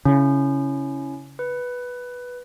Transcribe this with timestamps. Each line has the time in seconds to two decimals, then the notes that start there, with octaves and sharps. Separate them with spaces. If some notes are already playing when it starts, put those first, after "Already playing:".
0.05 C#3 C#4 E4
1.39 B4